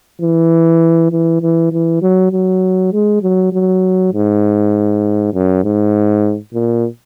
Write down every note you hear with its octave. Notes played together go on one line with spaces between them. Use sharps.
E3
E3
E3
E3
F#3
F#3
G#3
F#3
F#3
G#2
F#2
G#2
A#2